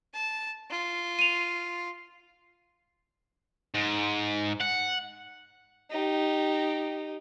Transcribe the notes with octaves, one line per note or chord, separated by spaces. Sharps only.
A5
F4
D#7 F7
G#2
F#5
D#4 G4